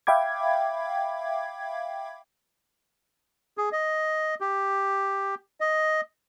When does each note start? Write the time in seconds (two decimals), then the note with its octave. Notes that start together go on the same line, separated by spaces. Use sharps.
0.07 E5 F5 G5 B5 D6 G#6
3.58 G#4
3.72 D#5
4.41 G4
5.60 D#5